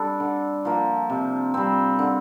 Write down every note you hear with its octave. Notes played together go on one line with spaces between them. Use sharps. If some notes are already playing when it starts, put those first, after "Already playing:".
Already playing: G3 D4 A4
D3
F3 A#3
C3
G3 C4
D3